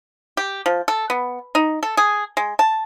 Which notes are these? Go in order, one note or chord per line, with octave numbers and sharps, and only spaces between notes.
G4
F3
A4
B3
D#4
A4
G#4
G#3
A5